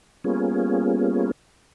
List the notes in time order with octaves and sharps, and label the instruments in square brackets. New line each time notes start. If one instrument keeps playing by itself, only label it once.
[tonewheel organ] G3 A#3 B3 C#4 F4 G#4